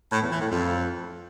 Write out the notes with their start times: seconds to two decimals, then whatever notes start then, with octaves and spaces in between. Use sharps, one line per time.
0.12 A2
0.21 E2
0.31 E3
0.41 A2
0.50 F2